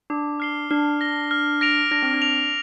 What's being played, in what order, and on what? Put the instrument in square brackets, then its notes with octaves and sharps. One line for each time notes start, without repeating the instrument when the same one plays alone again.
[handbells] D4 [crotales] D6
[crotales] F6 C7 G7
[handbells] D4 [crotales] F6
[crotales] A#6 G7
F6
A#6 D7 F7
[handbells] D4 [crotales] A#6
[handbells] C4
D4
[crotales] F7